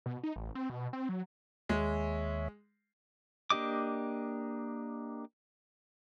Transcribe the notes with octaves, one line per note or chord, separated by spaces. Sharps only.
B2
D#4
A1
C4
B2
C4
F#3
D#2 G#3 C#5 E5
A#3 D4 G4 D#5 D6